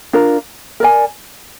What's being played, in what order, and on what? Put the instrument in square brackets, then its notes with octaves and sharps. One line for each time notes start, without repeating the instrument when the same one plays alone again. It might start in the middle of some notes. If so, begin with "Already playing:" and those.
[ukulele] D4 F4 A#4
A#4 D5 G#5